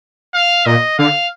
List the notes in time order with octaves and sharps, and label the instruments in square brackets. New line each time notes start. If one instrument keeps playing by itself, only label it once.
[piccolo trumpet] F5
[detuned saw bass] A#2 [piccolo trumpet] D#5
[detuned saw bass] D3 [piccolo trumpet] F5